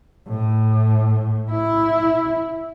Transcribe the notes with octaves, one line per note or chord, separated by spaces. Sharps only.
A2
E4